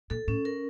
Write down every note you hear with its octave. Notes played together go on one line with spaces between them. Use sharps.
A#2 A4
A2 C#4
A#4